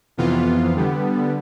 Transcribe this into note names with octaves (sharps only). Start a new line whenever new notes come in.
F2 C3 E3 B3 F4
D3 G3 B3